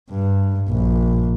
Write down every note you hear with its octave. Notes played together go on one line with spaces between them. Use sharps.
G2
A#1